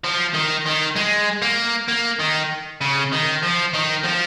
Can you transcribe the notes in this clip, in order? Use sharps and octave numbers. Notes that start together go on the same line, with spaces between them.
F3
D#3
D#3
G#3
A#3
A#3
D#3
C#3
D#3
F3
D#3
F3